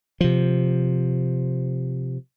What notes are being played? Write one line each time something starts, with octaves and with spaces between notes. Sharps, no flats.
C3 F3